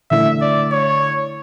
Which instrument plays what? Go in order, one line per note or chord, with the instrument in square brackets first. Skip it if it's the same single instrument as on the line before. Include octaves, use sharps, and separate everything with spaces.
[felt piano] D3 A3 E4 [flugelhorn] E5
[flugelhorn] D5
C#5